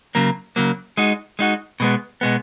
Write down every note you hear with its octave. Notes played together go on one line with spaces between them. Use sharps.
C#3 F#3 A#3
C#3 F#3 A#3
G#3 D#4 F#4
G#3 D#4 F#4
B2 G#3 B3
B2 G#3 B3